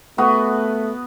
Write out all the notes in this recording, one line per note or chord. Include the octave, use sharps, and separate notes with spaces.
A3 B3 F#4